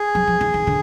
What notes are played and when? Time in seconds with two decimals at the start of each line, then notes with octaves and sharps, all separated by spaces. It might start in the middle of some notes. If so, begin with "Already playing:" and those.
Already playing: G#4
0.15 F#3
0.27 F3
0.41 E3
0.54 D#3
0.67 D3